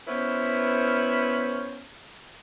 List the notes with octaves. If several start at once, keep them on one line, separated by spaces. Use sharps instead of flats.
B3 C#4 E4 B4 C5